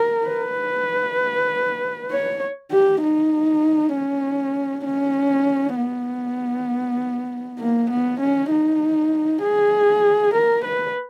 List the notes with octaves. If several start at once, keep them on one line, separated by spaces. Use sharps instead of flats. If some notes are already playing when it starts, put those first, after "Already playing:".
Already playing: A#4
B4
C#5
G4
D#4
C#4
C#4
B3
A#3
B3
C#4
D#4
G#4
A#4
B4